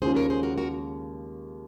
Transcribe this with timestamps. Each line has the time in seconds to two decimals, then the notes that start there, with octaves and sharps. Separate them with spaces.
0.02 D#2 C#3 G#3 C#4 F4 G#4 C5
0.16 A#4 C#5
0.30 G#4 C5
0.43 F#4 A#4
0.58 F#4 A#4